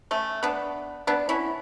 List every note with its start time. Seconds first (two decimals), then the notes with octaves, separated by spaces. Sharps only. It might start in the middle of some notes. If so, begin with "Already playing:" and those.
0.11 A3 C#4
0.43 B3 D4
1.07 B3 D4
1.29 C#4 E4